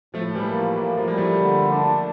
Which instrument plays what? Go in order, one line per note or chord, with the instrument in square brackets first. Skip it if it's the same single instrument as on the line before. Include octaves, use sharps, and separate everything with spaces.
[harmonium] A2 [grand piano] F3 A3
[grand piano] E3 G3
[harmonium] A#3
[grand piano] F3
[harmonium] A2 [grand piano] E3
[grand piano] F3
[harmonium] G3 [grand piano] A#3
[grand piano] F3 A3
[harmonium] D3
D4